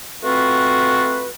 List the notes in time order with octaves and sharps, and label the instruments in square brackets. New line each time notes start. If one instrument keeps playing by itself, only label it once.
[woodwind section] A3 C4 F4 F#4 B4